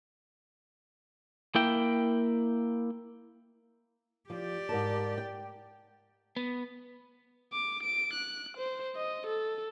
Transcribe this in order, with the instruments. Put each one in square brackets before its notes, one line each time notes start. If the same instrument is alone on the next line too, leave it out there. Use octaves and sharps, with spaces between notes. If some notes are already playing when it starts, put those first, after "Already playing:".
[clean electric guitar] A#3 E4 G5
[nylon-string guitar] F3 [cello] G4 D5
[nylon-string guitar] G#2 A#4 A5
G5
[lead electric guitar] B3
[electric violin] D6
D7
F#6
C5
D#5
A4